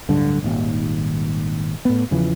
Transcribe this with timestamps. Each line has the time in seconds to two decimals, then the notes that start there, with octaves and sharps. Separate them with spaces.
0.09 D1 G2 D3
0.42 D#1 G#1 D#2
1.85 A2 B3
2.11 E2 C#3 E3 F3